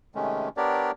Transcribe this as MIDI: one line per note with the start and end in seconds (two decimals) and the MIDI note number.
0.15 0.49 48
0.15 0.49 51
0.15 0.49 56
0.15 0.49 57
0.15 0.49 61
0.57 0.91 59
0.57 0.91 62
0.57 0.91 67
0.57 0.91 70
0.57 0.91 73
0.57 0.91 74